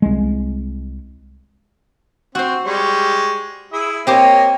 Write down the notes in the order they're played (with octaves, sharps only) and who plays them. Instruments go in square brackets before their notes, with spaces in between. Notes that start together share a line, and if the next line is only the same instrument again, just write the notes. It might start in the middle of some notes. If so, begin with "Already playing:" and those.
[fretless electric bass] C2 G#3
[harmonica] C4 [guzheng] F#4 C5
[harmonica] G3 G#3 C#6
E4 G#4 E5
[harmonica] A#3 C#5 D#5 [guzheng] C4 G4 C5